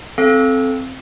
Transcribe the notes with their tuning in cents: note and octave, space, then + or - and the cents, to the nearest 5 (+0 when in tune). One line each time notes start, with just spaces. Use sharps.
C4 +0 A4 -15 F5 -10